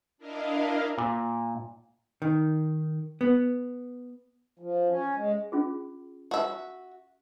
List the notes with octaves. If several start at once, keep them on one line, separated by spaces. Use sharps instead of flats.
D4 E4 A#4 D#5 F5
A#2
D#3
B3
F3
C#4
G#3
C#4 F4 G#4
F#4 E5